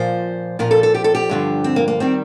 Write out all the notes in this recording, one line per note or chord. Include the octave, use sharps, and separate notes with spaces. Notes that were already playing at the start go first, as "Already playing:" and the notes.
Already playing: A#2 F3 C5
A#2 F3 A#4
A4
A4
G4
A4
G4
G2 D3 F3
C4
A#3
A#3
D#3 G3 C4